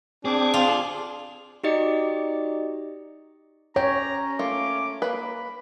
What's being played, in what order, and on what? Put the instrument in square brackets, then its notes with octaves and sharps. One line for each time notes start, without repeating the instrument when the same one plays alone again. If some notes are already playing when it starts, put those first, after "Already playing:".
[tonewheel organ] C4 D6 [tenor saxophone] D4 [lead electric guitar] G#4
[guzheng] F4
[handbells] D#4 F#4 G4 D5 D#5 C#7
[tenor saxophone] C#4 [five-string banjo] G4 [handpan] C#5 [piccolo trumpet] A#5
[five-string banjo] A3 A#3 F4 [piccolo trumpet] D6
[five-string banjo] A#3 B4 [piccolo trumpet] B5